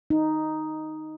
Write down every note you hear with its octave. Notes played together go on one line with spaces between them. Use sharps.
D#4